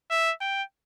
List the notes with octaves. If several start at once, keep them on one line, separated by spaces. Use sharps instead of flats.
E5
G5